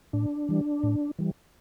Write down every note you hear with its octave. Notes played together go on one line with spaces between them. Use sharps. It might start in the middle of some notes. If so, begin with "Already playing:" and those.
A2 D4
E3 G3
A2
E3 G3